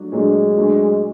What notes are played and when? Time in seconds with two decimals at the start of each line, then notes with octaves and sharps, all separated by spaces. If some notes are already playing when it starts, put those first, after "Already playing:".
Already playing: F#3 A3 D4
0.12 A#2 F#3 G#3 A3 D4
0.57 A#2 F#3 A3 D4